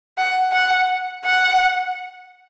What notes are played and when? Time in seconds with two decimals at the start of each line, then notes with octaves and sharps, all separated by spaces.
0.18 F#5
0.52 F#5
1.25 F#5